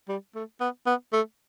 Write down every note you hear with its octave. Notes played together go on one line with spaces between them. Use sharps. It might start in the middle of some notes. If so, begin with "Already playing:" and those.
G3
A3
B3
B3
A3